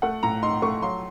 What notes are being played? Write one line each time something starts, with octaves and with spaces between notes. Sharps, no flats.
A3 F#5
A2 A#5
D#4 C6
A3 C#6
F#3 C6